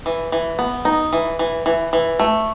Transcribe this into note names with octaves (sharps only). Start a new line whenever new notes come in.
E3
E3
B3
D#4
E3
E3
E3
E3
A3